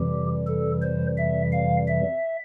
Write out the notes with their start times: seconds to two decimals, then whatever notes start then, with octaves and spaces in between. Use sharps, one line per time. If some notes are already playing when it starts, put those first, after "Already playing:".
Already playing: F2 C3 E3 G3 G4
0.47 A4
0.82 C5
1.17 E5
1.52 F5
1.87 E5